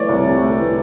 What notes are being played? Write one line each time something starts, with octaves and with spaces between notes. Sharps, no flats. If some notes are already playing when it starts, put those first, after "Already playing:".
Already playing: E3 A3 C#5 D5
C2
C3
A3
E3